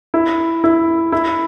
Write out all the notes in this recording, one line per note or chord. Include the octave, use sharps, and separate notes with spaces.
E4
E4
E4